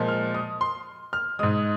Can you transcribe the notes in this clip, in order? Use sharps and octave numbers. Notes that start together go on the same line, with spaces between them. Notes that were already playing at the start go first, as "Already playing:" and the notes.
Already playing: A#2 F3 G#3
F6
D#6
C6
F6
G#2 G#3 D#6